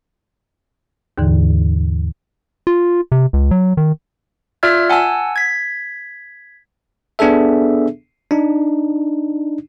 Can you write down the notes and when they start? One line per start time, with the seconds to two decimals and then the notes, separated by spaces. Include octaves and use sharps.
1.18 D#2 G#2 D3 E3
2.67 F4
3.12 C3
3.33 C#2
3.51 F#3
3.77 D#3
4.63 F4 D5 E5 E6 F6 G#6
4.90 F#5 G#5 A5 E6
5.36 G#6 B6
7.19 B3 D4 G#4 A4 E5
8.31 D4 D#4